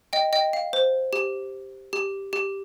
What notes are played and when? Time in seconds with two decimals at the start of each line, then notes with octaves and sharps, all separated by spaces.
0.13 D#5 G5
0.33 D#5 G5
0.53 F5
0.73 C5
1.13 G4
1.93 G4
2.33 G4